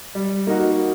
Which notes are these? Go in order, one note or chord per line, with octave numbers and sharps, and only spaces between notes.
G3
A#3 D#4 F#4